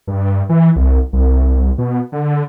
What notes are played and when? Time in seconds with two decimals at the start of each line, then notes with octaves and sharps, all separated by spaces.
0.07 G2
0.49 E3
0.76 C2
1.13 C2
1.78 B2
2.12 D3